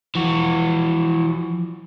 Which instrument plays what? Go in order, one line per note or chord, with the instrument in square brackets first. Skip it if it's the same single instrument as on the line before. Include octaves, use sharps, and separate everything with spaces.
[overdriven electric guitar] E3 F#4 [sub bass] F3